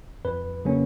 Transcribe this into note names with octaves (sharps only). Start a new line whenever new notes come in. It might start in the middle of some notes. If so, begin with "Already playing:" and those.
F2 B4
C#3 F#3 A#3 C#4